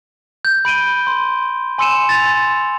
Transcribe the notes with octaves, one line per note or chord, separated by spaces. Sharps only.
G6
B5 D7 D#7 G7
C6
G#5 C6 E6 C#7 D#7 E7
A6 F7
C6